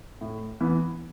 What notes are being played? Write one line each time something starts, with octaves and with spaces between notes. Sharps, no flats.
A2
E3 B3